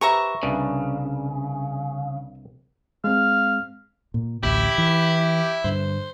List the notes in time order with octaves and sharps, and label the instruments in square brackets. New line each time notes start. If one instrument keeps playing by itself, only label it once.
[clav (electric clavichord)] G4 B4 C5 [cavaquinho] E5 A#5 C#6
[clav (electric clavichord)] C2 D4 B4 [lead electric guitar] C#3
[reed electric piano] G#3 C4 [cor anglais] F5
[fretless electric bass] A#2
[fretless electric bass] A1 D2 [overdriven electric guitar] E4 [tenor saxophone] G4
[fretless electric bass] E3
[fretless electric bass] G2 D3 [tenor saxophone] C5